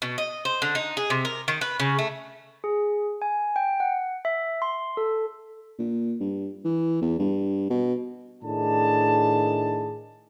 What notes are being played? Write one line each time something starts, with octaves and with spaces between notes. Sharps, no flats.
B2
D#5
C5
D3
D#4
G#4
C3
A#4
D#3
B4
C#3
A3
G#4
G#5
G5
F#5
E5
C6
A4
A#2
G2
E3
E2
G2
B2
A2 D#3 D4 G#4 A5